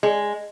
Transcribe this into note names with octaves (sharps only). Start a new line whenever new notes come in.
G#3